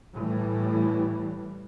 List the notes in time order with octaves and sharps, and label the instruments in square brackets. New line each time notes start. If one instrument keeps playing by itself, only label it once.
[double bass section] A2 E3 G3